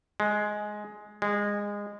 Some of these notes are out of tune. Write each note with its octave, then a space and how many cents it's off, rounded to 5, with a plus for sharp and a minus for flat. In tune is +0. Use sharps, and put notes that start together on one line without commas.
G#3 +10
G#3 -20